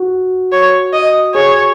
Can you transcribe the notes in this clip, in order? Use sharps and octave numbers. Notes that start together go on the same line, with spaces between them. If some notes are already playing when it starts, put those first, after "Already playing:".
Already playing: F#4
C#5
D#5
G#4 C#5